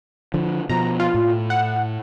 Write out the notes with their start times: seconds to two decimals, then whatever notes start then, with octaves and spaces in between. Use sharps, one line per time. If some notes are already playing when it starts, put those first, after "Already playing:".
0.34 D3 F3
0.69 B2 F3 A#5
1.00 F4
1.14 A2
1.50 F#5